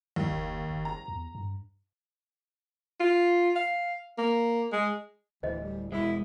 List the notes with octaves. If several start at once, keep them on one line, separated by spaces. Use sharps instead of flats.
D#2
F#1
F#1
A#5
E2
G2
F4
F5
A#3
G#3
D1 D2 E3 C5 D#5
G3
E1 G#3 E4